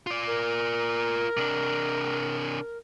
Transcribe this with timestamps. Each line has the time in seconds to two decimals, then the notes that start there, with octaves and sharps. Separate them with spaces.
0.07 F4 D5
0.27 A#4
1.37 C3 D4